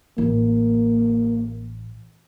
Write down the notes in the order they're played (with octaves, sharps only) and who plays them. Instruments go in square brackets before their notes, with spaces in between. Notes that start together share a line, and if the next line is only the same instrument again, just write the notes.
[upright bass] A1 [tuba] A#3